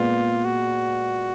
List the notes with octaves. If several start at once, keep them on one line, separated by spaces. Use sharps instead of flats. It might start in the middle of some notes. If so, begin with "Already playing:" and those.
Already playing: A#2 G#3 B3 F4
F#4